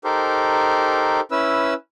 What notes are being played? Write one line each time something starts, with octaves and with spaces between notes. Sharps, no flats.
D#4 G4 A4 A#4 C5
C#4 E4 B4 E6